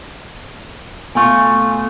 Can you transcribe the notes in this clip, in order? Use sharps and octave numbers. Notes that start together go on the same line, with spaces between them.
B2 A3 F4 G#5 C#6